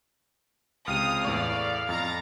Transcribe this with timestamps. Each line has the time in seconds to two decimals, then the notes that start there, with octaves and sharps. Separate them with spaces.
0.87 C#2 C3 F5 D#6
1.25 E2 A2 D5 C#6
1.89 F2 A#5 A6